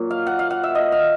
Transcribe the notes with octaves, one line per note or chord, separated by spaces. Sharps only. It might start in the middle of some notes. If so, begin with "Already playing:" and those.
Already playing: A#2 F#3
F5
F#5
F5
F#5
E5
D#5
F5